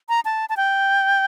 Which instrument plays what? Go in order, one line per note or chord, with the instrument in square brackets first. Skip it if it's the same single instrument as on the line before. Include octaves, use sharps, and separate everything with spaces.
[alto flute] A#5
A5
A5
G5